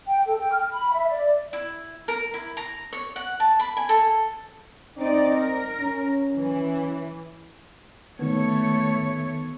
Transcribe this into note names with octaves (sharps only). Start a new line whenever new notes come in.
G5
A4
G5
F6
B5
E5
D5
E4
A#4
E4
A#5
C#5
F#5
A5
B5
G#5
A4
C4 D#4 D5
A#4
C#4
E3
D#3 A3 B3 C#5